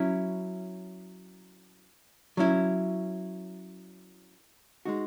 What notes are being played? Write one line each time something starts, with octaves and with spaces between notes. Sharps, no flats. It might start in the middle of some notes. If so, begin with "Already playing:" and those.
Already playing: F#3 C#4 E4
F#3 C#4 E4
G#3 D#4 F#4